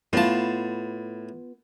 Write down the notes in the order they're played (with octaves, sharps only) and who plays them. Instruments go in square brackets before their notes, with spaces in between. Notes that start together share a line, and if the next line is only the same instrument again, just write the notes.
[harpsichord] A2 A5 [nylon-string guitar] B3 F4